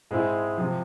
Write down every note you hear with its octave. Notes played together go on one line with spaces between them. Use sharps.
G#2 G#3 C4 E4 G#4
C3 F3